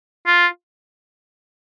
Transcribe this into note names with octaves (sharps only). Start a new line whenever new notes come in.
F4